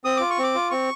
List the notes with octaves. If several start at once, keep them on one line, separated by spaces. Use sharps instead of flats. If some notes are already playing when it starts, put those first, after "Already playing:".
C4 D#6
F4 D6
C#6
C4
D6
F4
C4 C#6